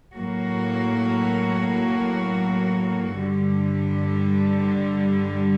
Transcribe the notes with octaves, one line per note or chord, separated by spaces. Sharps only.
A2 F#3 A#3 F#4
G2 D3 G3